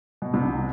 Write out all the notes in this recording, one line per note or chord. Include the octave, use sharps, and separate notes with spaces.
B2
C2 C3